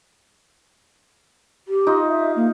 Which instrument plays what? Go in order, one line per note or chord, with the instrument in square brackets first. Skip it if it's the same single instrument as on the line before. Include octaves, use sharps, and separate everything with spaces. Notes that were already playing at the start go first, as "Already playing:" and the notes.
[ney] G4
[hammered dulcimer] D#4 F4 D#5
[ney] E5
A#3